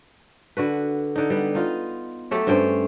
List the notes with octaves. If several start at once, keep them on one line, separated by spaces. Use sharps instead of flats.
D3 F#4 B4
D3 D#4
G3 B3
D#4 F4
F#3 A3 G4 A4
G2 C#4 C5 G5